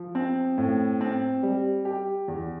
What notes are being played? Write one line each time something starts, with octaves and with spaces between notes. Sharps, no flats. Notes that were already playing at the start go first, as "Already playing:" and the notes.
Already playing: F3
C4
A2
C4
G3
G4
E2